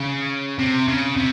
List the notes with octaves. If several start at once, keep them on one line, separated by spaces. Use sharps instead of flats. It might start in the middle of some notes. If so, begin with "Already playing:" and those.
Already playing: C#3
C3
C#3
C3